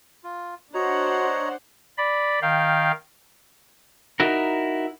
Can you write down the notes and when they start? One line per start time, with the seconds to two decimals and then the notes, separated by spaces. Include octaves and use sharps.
0.24 F4
0.74 D4 F#4 C5 C#5 D#5 F#5 A#5
1.98 D5 B5
2.42 D#3 F5 G5
4.20 D#4 E4 F#4 A#4